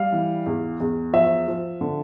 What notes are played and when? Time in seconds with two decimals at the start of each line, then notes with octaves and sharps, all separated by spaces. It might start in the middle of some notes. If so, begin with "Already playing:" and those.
Already playing: G3 F5
0.12 E3
0.46 E2
0.80 E2
1.13 F3 E5
1.48 F3
1.81 D3